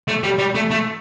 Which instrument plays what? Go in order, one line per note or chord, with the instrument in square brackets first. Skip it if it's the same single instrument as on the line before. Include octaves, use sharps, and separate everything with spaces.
[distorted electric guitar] A3
G3
G3
A3
A3